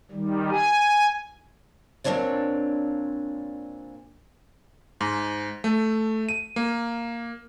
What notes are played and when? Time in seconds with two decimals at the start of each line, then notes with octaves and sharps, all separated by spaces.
0.11 D#3 G3
0.50 G#5
2.04 A#2 A#3 C4 D4 C#5 D5
5.01 G#2
5.64 A3
6.29 D#7
6.56 A#3